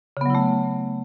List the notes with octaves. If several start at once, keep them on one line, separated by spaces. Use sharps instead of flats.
C#3 F#3 A3 B3 E4